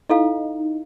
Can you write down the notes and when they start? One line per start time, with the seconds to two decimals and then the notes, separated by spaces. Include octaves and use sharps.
0.09 D#4 E4 A4 F5